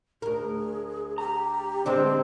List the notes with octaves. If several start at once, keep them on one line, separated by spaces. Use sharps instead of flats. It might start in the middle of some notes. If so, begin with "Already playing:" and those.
D2 G#4 A#4
G4 A#5
D3 G#3 B3 C4 D4